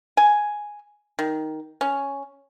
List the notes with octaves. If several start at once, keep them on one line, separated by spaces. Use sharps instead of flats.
G#5
D#3
C#4